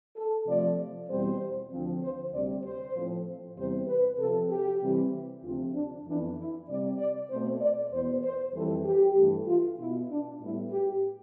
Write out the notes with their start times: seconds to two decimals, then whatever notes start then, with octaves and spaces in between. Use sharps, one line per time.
0.15 A4
0.46 C3 F3 A3 D5
1.08 E2 B2 G3 C4 C5
1.71 D2 D3 F3 C4
2.01 C5
2.32 D2 C3 G3 C4 D5
2.63 C5
2.94 A2 F3 A3 C4
3.56 E2 C3 G3 C5
3.87 B4
4.18 C3 F3 C4 A4
4.49 G4
4.81 C3 E3 G3 C4
5.42 D2 C3 F3 C4 F4
5.73 D4
6.05 F2 E3 B3 D4
6.36 E4
6.67 C3 G3 C4 D5
6.98 D5
7.28 B2 A3 C4 C5
7.60 D5
7.91 E2 B2 B3 C5
8.23 C5
8.54 F2 E3 G3 C4 A4
8.84 G4
9.15 G2 E3 A3
9.46 F4
9.77 B2 B3 E4
10.09 D4
10.40 A2 G3 B3 E4
10.71 G4